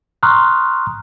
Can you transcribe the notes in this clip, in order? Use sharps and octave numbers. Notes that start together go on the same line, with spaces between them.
A#5 C6 C#6 D#6 F6 F#6